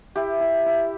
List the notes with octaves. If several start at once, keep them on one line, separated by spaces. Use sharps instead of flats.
E4 G4
E4
E4